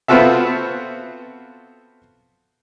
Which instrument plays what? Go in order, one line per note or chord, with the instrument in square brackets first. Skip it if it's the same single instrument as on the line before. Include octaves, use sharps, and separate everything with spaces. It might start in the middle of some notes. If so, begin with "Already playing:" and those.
[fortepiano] B3 C4 F4 F#4 A4 E5